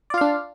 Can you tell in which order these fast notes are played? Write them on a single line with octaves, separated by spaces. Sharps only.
D5 F4 F5 D4